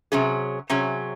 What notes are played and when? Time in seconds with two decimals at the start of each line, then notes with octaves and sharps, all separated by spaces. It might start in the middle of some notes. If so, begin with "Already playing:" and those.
0.12 C3 F#3 C#4 G#4
0.70 C3 F#3 C#4 G#4